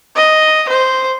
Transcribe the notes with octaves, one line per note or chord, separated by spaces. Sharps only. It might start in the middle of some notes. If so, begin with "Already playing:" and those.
D#5
C5